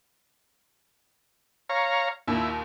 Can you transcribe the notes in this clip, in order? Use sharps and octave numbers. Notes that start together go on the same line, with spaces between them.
C#5 F5 A#5
D#2 A#2 E4